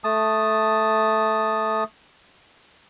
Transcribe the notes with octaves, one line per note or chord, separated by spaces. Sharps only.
A3 A5 D#6